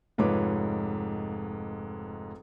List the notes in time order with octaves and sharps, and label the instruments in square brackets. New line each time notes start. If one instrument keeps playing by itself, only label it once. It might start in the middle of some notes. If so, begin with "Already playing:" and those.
[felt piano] F1 G#2 F4 B4 C#5 D6